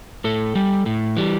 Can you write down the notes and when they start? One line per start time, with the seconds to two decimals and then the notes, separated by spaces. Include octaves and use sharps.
0.24 A2 A4
0.55 G3
0.86 A2
1.17 E3 G3